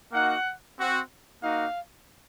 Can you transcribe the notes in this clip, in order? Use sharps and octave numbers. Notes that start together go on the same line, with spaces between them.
A#3 D#4 F#4 F#5
C4 F#4
A#3 D#4 F#4 F5